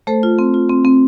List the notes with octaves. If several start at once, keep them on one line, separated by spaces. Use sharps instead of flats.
A3 A4 C5
F4
C4
F4
C4
C4